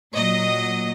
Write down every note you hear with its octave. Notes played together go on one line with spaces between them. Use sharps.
A#2 F#3 D#5